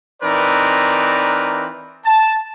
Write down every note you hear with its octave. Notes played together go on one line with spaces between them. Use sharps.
E3 C4 D#4 A#4 B4 D5
A5